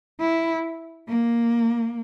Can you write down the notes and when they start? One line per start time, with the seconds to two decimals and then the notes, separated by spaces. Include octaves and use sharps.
0.21 E4
1.09 A#3